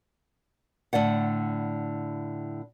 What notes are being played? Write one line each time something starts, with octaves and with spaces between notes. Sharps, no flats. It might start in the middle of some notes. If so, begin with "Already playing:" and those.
A2 D3 D5 F#5